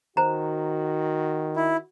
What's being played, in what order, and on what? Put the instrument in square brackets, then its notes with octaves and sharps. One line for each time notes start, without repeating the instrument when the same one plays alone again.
[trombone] D#3 [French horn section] F#4 [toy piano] C5 A#5
[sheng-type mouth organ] E4